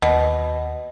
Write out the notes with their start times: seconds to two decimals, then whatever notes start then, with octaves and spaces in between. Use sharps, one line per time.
0.02 D#2 B2